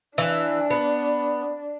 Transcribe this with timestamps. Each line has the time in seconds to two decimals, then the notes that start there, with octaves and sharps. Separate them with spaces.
0.18 E3 D4
0.70 B3